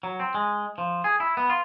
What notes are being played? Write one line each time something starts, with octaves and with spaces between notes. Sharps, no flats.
F#3
C4
G#3
F3
G#4
E4
B3
F4